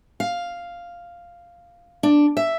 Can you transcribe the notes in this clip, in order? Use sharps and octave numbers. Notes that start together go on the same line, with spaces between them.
F5
D4
E5